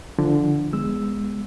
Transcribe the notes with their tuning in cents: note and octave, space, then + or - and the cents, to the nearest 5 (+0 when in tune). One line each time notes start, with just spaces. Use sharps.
D3 +0 F3 -25
G#3 -10 B3 +0 E6 +0